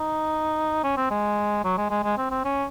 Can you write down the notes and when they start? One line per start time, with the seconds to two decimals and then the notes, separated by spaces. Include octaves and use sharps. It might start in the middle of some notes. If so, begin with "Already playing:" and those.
Already playing: D#4
0.84 C#4
0.97 C4
1.10 G#3
1.64 F#3
1.77 G#3
1.90 G#3
2.04 G#3
2.18 C4
2.31 C4
2.44 C#4